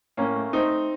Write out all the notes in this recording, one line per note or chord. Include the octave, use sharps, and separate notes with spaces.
A2 A#3 C#4
A3
A3 C4 D#4
A3